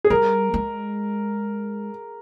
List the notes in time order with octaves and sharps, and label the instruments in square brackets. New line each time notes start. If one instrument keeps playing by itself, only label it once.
[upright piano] G#4
[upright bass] G3 [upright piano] A#4
[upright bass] G#3